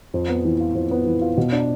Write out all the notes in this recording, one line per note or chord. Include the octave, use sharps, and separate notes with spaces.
F2
B3
E3
F4
F2
B3
E3
F4
B2
D4